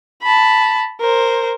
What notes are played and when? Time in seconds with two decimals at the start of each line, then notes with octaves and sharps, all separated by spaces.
0.23 A5 B5
1.00 A#4 C5